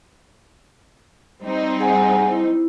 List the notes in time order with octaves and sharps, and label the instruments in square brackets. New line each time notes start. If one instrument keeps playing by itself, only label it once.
[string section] G3 C4 D#4
[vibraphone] G#4 F#5 G#5
E4